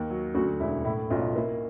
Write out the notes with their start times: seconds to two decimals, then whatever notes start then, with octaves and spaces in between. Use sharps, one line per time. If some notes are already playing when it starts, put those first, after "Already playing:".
Already playing: D#2
0.10 F#3
0.35 D2 F#4
0.60 E1 E4
0.85 A2 E4
1.10 B1 F4
1.36 A#3 E4